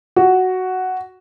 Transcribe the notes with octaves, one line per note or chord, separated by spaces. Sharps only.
F#4